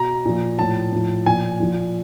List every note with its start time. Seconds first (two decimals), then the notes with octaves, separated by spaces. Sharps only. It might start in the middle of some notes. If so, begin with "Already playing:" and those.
Already playing: B2 A#5
0.25 A#2 F3
0.59 A2 F3 A5
0.93 A2 F3
1.26 A#2 F3 G#5
1.60 A#2 F3